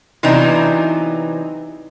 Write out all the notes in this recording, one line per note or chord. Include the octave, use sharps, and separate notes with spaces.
C3 E3 F#3 B3 D4 D#4